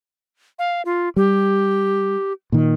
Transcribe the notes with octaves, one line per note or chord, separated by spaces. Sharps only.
F5
F4
G3 G4
A#2 D#3